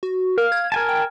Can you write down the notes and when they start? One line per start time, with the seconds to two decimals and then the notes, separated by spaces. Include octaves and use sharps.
0.03 F#4
0.38 A#4 F5
0.52 G#6
0.72 A#4 G#5 A5
0.89 G5